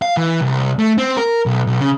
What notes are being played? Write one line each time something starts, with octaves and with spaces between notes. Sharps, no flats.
F5
E3
C2
A3
C4
A#4
B1
B1
C#3